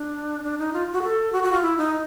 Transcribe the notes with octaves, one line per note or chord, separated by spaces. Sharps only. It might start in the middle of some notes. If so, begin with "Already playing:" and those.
Already playing: D4
D4
D#4
F4
F#4
A4
F#4
F#4
F4
E4
D#4